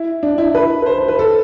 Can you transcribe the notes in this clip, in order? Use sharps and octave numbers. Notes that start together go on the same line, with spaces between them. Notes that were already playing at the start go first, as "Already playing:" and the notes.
Already playing: E4
D4
E4
B4
B4
C5
C5
B4
A4